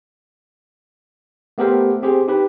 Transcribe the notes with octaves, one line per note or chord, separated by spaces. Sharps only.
A3 B3 G4 A4 A#4 C5
C4 G4 G#4 C5
D#4 G4 B4